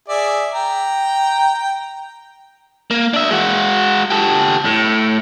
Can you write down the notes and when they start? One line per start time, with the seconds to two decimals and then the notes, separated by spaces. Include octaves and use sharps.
0.09 G#4 D5 E5
0.53 G5 A#5
2.91 A#3
3.14 D4 E5
3.31 G#3 F#4
4.10 G4 A4
4.65 A2